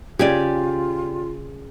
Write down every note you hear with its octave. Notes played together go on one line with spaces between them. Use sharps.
C#3 F4 G4 D5 G#5